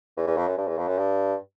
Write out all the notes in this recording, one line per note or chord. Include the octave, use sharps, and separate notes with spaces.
E2
E2
F2
F#2
G2
E2
F2
F#2
G2